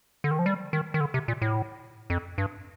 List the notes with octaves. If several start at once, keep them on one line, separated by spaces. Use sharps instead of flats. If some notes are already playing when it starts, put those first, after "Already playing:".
D3
D#3
F3
G3
D#3
D#3
D3
C3
A#2
A2
F2
G2